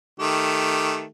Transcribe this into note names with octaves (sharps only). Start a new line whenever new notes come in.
D#3 A3 G4